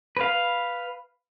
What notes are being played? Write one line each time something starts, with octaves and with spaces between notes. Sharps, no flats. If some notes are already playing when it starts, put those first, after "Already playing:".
B4 F5